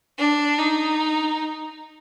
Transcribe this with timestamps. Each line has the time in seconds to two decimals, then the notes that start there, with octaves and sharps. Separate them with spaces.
0.19 D4
0.58 D#4